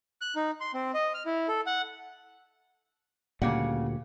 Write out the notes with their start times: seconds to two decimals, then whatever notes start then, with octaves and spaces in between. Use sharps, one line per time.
0.21 F#6
0.36 D#4
0.61 C6
0.74 C4
0.94 D#5
1.14 F6
1.26 E4
1.48 A4
1.66 F#5
3.42 D2 A#2 C#3 G3 A#3 F#5